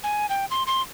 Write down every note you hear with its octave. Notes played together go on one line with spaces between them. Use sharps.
G#5
G5
C6
C6